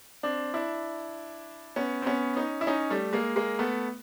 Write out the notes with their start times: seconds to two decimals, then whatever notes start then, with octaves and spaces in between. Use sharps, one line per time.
0.23 C4 D4
0.54 D4 E4
1.76 B3 C#4
2.02 C4
2.06 B3 C#4
2.36 C#4 D#4
2.61 E4
2.67 C#4 D#4
2.90 G3 A3
3.13 G#3 A#3
3.36 G#3 A#3
3.59 A3 B3